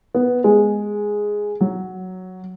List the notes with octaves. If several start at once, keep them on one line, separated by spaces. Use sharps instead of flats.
B3
G#3
F#3